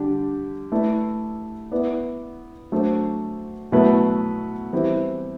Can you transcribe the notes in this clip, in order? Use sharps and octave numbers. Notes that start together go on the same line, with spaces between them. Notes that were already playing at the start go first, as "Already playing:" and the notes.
Already playing: D3 G3 D4 G4
A3 E4 B4 D5
B3 E4 B4 D5
F#3 A3 D4 A4 C5
B2 F#3 A3 E4 B4
E3 G3 C4 E4 G4